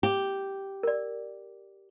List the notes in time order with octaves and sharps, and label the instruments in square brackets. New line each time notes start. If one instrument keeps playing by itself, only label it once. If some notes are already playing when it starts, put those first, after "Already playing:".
[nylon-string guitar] G4 [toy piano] D6
[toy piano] A#4 D5